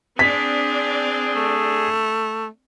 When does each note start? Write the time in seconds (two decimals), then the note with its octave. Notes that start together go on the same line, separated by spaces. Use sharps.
0.19 C4 D4 G#4 B6
1.36 A3